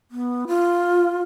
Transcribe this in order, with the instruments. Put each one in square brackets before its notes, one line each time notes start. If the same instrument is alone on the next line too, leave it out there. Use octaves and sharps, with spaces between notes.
[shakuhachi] B3
F4